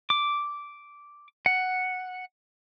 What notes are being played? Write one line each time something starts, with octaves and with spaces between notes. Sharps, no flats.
D6
F#5